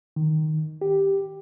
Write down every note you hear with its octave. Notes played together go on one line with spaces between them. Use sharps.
D#3
G4